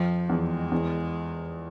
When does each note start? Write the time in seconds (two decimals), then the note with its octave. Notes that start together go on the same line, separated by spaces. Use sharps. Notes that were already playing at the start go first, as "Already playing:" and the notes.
Already playing: F2 F3
0.29 E2 G#3
0.72 E2